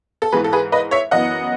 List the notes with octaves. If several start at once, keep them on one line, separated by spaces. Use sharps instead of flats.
A4
G#2 E3 G#3 G#4 B4
A4
G#4 B4
B4 D#5
C#5 E5
F#2 E3 B3 D#5 F#5